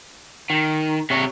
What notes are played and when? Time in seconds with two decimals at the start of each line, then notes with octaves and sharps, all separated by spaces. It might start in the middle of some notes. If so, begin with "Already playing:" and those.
0.50 D#3
1.10 C3 C#5